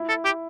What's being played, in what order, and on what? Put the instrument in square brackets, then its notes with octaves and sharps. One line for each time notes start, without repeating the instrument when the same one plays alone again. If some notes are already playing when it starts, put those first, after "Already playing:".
Already playing: [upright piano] E4
[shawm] A4
G4